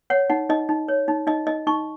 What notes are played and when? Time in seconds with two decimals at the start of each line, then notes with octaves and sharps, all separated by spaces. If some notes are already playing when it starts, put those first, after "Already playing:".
0.10 C#5 F#5
0.30 D#4 F#5
0.49 D#4 D#5
0.69 D#4
0.88 C#5
1.08 D#4
1.27 D#4 D#5
1.46 D#4 D#5
1.67 D#4 C#6